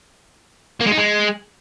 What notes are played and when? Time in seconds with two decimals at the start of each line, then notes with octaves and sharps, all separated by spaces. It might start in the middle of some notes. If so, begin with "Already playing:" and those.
0.81 A#3
0.87 G#3
0.92 D#4
0.98 G#3